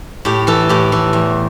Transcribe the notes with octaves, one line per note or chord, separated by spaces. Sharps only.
A2 G4
E3 A4
A2 G4
E3
E2